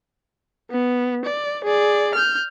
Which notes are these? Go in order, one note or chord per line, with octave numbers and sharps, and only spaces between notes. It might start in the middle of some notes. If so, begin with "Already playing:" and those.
B3
D5
G#4 D5
F6 G6